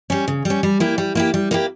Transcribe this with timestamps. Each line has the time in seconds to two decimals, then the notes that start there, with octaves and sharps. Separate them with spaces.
0.10 G3 C#4
0.28 C#3
0.45 G3 C#4
0.63 G3
0.80 A#3 E4 G4
0.98 G3
1.15 A#3 E4 G4
1.34 G3
1.51 A#3 E4 G4